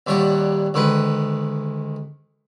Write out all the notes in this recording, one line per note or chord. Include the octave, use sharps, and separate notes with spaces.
D#2 A#2 G3 C#5 F#5
D2 D#3 G#3 B4